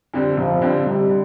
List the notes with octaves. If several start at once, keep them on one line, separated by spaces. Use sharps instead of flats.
F2 D3 G3 C4
F1 F3
F2 D3 G3 C4
F1 G3
D3